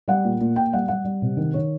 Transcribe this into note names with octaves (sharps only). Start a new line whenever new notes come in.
G3 F#5
A#2
A#2
A#2 G5
G3 F#5
G3 F#5
G3
C3
D#3
D#3 C#5